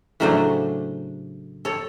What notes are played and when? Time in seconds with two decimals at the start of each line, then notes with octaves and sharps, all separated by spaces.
0.20 A2 C#3 F#3 A3 D4 C5
1.65 A4 C#5